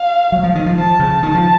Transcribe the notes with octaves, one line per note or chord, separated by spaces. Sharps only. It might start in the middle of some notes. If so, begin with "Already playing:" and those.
Already playing: F5
F#3
F3
D#3
F3
F3 A5
C#3
D#3 A5
F3